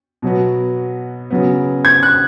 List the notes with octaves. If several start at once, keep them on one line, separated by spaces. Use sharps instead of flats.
B2 F#3 B3
C#3 F#3 B3
G#6
F#6